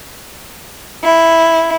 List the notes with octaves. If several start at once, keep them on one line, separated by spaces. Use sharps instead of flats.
E4